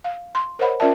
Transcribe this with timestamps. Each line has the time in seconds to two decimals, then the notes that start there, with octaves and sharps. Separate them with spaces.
0.04 F5
0.35 C6
0.59 A#4 C5 C#5 D#5 F#5 B5
0.80 C#4 F4 A#4 D5 E5 A5